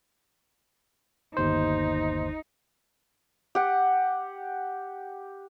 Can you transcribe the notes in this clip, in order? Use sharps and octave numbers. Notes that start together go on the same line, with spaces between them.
G1 D#2 D#4 C5
G4 F#5